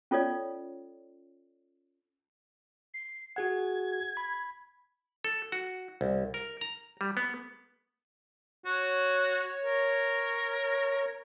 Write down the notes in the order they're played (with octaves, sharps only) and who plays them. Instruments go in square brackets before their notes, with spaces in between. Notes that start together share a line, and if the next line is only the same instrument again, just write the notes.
[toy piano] C#4 F4 A4 C#5 D5
[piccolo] C7
[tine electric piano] F#4 G#4 F#5 [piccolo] G#6
[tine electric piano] B5
[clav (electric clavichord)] A4
F#4
C2
A#4
A#5
G3
B3
[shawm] F#4 [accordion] C#5
[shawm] A#4